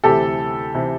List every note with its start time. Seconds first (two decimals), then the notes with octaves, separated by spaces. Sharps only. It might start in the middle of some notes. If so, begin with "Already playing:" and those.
0.04 D2 C3 E3 G4 A4
0.74 C3 E3